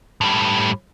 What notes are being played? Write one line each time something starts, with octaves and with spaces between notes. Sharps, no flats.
A2 G3